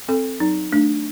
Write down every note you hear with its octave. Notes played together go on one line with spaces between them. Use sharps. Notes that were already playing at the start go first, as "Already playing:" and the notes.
C4 A4
F#3 D#4
A3 D4